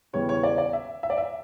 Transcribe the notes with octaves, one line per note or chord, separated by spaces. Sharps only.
E2 C#3 E3 G3 B3 C#5
C#5
D5
D5
E5
E5
D5
E5